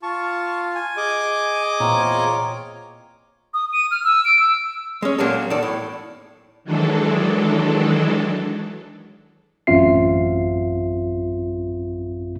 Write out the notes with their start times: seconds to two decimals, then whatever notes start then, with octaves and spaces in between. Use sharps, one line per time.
0.03 F4 A5 C#6
0.75 G#5
0.97 G#4 D#5 D6
1.80 E2 A#2 C4 F4 C#5 A#5
3.54 D#6
3.73 D#7
3.91 F6
4.04 E6
4.25 D7
4.39 E6
5.02 G#3 C#4
5.18 A#2 F#3 A#3 C4 C#4 A4
5.50 E2 D#3 A4 D5
5.63 A2
6.64 D#3 E3 F#3 G#3 D4 A4
9.67 A1 F#2 C4 F4 E5 C7